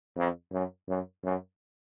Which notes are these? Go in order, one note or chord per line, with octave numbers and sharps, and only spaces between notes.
F2
F#2
F#2
F#2